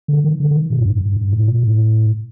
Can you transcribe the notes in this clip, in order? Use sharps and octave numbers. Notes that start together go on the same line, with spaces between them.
D3
D#3
D3
D3
D#3
A#2
F#2
G2
G2
G2
A2
A#2
A2